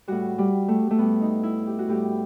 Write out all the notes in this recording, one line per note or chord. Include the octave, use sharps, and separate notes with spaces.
A2 G3 F#4
G3
A3
A3
A2 G3 B3
D#4
E4
G4
F#4
A2 G3 G4